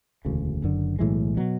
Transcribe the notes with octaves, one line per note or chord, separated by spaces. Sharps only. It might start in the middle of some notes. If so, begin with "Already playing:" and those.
E1 D2 C#3
F#1 F#2 D3
B1 A2 E3 G#3
B2 F#3